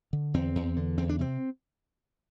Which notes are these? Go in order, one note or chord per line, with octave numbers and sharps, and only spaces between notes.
D3
E2 C4
E2
D3
E2 C4
D4
C3 C4